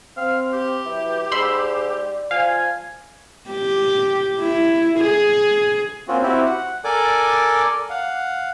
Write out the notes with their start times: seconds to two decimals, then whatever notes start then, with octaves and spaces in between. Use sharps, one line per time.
0.17 C4 F5
0.53 G4
0.86 F#3 E4 B4
1.32 G#2 D5 B5 C6 E6
2.31 F3 F5 G#5
3.51 G4
4.40 E4
4.99 G#4
6.08 A#3 C4 C#4 F4 F#4
6.23 C4 E4 F#4 G4
6.45 F#5
6.85 A4 A#4 D5 G#5 D6
7.90 F5 F#5